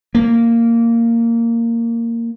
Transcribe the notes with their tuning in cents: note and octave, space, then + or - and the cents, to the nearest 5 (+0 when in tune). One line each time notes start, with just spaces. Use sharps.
A#3 -10